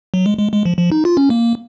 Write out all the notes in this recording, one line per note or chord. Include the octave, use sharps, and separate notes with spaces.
F#3
G#3
G#3
G#3
F3
F3
D#4
F4
C#4
A#3